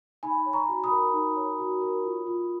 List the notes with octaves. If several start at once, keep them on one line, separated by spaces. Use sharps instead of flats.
D#4 G#5 B5
C#5
A#5 C#6
F#4
B5 D#6
A#4
D#4
C#5
F#4
A#4
F4
F4